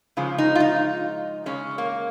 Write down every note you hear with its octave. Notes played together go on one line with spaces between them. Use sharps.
C#3 F3 G#3
D#4
F4
D#4
C#3 G#3 C#4
A#3